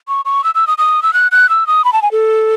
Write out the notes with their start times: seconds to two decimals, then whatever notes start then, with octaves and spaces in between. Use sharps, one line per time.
0.08 C#6
0.25 C#6
0.44 E6
0.55 E6
0.67 D#6
0.78 D#6
1.03 E6
1.13 F#6
1.32 F#6
1.49 E6
1.67 D#6
1.85 B5
1.93 A5
2.02 G#5
2.12 A4